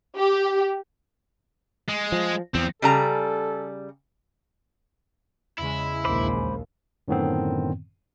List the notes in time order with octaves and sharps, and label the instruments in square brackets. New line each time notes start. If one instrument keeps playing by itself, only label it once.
[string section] G4
[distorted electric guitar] G#3
[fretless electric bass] F3
[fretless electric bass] E2 [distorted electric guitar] F3 C4
[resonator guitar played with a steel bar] C#3 G3 A#5 [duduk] A4
[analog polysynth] E2 C#3 G#3 [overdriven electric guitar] E4
[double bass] A#1 D#2 [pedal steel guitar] C5 B5 D6
[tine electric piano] F#2 A2 D3 D#3 B3 C4